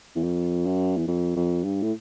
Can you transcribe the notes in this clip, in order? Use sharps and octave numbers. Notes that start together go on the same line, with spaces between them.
E2
F2
F#2
E2
F2
F2
G2
A2